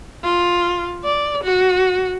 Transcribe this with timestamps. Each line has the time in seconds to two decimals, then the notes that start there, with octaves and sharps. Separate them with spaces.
0.24 F4
1.04 D5
1.44 F#4